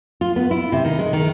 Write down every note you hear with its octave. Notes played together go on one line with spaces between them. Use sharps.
F4
B3
E4
C3
D#3
G#3
D#3